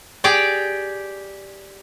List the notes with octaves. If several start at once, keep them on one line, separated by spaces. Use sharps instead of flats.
G4 G#4 D5 G5